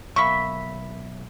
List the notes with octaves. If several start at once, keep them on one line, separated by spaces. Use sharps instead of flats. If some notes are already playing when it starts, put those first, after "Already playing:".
B1 A#3 E5 B5 C#6